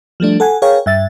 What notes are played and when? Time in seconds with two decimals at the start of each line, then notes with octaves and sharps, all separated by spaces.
0.20 F3 G3 A3 D4
0.40 A4 F#5 G#5
0.62 G#4 A#4 C#5 F5 G5
0.86 G2 E5 A6